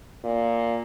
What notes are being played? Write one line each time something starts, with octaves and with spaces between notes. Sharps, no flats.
A#2